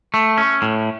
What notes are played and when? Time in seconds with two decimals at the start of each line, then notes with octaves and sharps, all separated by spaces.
0.14 A3
0.38 C#4
0.62 A2